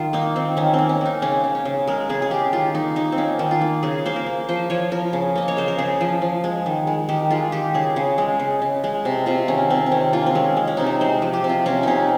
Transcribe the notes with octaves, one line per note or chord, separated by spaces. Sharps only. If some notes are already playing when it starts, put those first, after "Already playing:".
Already playing: D#3 F4
A#3 D#4
D#3 C4
D#3 C#4
C4
A#3
C#4
A#3 D#4
C#3 C#4
C#3
C#4
C#3
G#3 A#4
C#3 G#4
G#4
C#3 G4
D#3 F4
A#3 D#4
A#3 D#4
C4
A#3 C#4
D#3
F4
A#3
C#3 G#4
A#3 C5
A#4
A#3
F3 C5
F3 C#5
F3 A#4
C#3
A#3 D#5
C#5
C#3 C5
A#4
C#3 G#4
F3
F3
G#3
D#3
G#3
D#3 G4
G#3 F4
D#3 G4
C#3 G#4
C#3
G#3
C#3
C#3
G#3
C3
C3 F4
D#3 C#4
C3 C4
C4
D#3 C#4
A#3 F4
C4
G#3 C#4
G#3
C#4
C3 D#4
C#4
G#3 C5
F3
G4
C3
F4
C3 C#4
C3 C#4 D#4